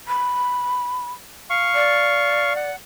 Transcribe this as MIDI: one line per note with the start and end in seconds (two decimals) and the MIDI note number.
0.08 1.11 83
1.50 2.53 77
1.50 2.53 85
1.75 2.71 74
2.56 2.76 78